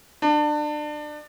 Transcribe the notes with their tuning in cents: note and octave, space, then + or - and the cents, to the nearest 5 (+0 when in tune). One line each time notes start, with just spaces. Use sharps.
D4 +30